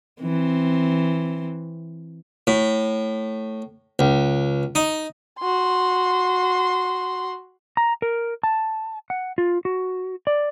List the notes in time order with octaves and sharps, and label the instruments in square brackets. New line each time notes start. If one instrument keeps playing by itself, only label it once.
[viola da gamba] E3 C4
[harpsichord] A2
C#2
D#4
[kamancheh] F#4 C6
[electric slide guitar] A#5
A#4
A5
F#5
F4
F#4
D5